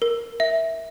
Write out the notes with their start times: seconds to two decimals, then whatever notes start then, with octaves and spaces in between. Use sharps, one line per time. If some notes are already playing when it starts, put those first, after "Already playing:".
0.02 A#4
0.40 E5